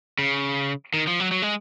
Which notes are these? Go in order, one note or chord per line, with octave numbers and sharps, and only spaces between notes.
C#3
D#3
F3
F#3
F#3
G#3